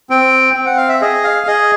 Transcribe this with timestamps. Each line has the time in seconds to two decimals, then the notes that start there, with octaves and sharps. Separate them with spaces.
0.10 C4 G5
0.54 C4 G5
0.65 F#5
0.77 F5
0.89 E5
1.01 G#4 D#5
1.24 F5
1.47 G#4 D#5